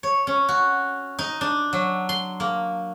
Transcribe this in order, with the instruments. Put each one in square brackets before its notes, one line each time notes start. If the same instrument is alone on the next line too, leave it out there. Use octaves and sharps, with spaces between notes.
[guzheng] C#5
C#4
F#4
D#4
D4
F#3
C6
A#3